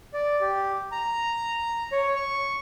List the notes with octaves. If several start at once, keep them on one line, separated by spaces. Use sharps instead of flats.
D5
G4
A#5
C#5
C#6